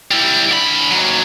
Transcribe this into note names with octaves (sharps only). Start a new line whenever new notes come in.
G3 E4
D3 B5
D#2 F#3